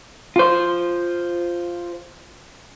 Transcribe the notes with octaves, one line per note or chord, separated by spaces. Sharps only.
F4 C5